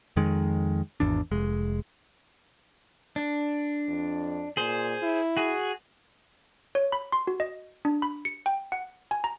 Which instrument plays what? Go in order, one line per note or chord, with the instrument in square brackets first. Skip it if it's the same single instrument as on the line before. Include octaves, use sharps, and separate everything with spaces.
[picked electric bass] F2 D#3 G#3
G#1 E2 D4
F1 G#3
[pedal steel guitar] D4
[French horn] F2
[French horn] A#2 [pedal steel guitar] G#4 C5
[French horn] E4
[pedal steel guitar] F#4 G#4
[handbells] C#5
B5
C6
F#4
D#5
D4
B5
C#7
G5
F#5
G#5
A#5